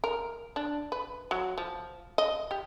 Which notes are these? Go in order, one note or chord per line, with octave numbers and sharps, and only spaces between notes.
A#4
D4
B4
F#3
F3
D#5
G4